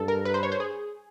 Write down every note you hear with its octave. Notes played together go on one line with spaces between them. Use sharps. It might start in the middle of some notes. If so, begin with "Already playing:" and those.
Already playing: G2 A4
A#4
B4
C5
C#5
C5
G#4